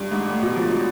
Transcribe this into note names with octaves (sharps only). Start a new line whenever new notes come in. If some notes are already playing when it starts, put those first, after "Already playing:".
Already playing: G2
G#2
A2
B2
F3
F#3